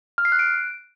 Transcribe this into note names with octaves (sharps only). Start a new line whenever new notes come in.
F6
C7
F#6
D7